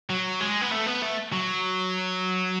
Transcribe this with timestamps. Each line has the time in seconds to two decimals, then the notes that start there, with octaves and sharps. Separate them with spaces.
0.10 F#3
0.41 G#3
0.62 B3
0.72 A3
0.87 B3
1.02 A3
1.32 F#3